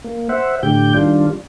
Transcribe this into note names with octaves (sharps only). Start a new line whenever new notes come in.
A#3
C5 E5 F#5
A2 D3 G4 G5 G6
D#3 G3 D4 F4